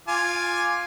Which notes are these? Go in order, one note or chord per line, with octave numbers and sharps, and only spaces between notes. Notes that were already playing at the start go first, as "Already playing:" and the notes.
F4 G#5 D6